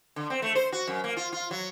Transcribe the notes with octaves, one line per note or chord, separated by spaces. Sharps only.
D3
C4
A3
C5
F#4
F#2
A#3
F4
F4
F#3